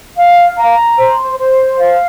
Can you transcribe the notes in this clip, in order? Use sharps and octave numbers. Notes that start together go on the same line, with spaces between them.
F5
A#5
C5
C5
F5